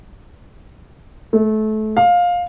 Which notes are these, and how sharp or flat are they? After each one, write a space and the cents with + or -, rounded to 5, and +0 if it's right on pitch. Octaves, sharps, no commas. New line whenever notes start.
A3 -25
F5 +15